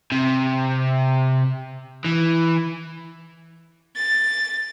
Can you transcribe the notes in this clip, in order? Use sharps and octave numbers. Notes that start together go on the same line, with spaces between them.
C3
E3
A6